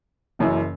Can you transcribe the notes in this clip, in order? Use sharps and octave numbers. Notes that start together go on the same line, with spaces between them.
F#1 F#2 E3